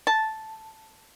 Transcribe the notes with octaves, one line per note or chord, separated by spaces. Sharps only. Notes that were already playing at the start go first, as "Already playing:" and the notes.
A5